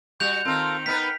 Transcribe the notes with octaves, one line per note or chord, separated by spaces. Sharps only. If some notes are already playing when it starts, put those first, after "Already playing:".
G3 F#4 C#6 G6 F7
D#3 C4 F4 A4 A#4
B3 D#4 A#4 B4 G5 B6